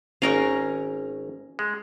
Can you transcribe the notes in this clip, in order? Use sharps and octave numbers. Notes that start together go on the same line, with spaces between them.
G#1 C#4 A#4 F5 A#5 C#6
G#3